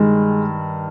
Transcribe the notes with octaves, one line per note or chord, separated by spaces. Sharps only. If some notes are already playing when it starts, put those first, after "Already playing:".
Already playing: G2 D#3 G3 G#3